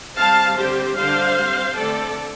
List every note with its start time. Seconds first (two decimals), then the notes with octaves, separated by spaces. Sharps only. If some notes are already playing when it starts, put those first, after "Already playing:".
0.17 G3 C4 F5 A5
0.57 D3 G3 C4 G4 C5
0.96 D3 G3 D4 C5 F5
1.36 G3 C4
1.76 D3 A3 C4 A4 D5